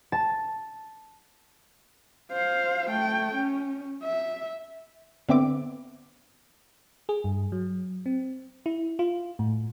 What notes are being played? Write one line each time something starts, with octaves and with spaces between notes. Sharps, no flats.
A5
C5 F5
A3 G5
C#4
E5
D3 B3 C4 E5 D6
G#4
G2
F#3
C4
E4
F4
A2